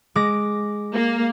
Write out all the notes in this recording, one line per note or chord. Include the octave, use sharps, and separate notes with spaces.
G#3 D6 A#6
A#3